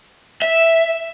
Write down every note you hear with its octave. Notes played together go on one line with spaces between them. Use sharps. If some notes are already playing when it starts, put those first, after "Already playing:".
E5